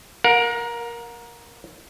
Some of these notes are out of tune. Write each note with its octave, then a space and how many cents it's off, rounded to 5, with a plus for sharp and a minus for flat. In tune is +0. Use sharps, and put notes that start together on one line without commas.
A#4 +15 F#5 -45